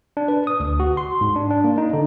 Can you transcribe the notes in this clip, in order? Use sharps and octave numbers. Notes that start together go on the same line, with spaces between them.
D4
B4
D#6
D2
F#4
C6
G#2
D4
D4
A#3
D#4
D3